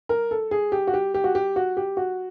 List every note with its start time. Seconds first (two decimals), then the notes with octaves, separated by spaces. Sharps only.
0.09 A#4
0.31 A4
0.51 G#4
0.72 G4
0.87 F#4
0.94 G4
1.14 G4
1.24 F#4
1.35 G4
1.56 F#4
1.77 G4
1.97 F#4